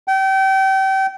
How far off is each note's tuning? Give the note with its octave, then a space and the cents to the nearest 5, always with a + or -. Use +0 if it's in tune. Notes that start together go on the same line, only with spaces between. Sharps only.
G5 -30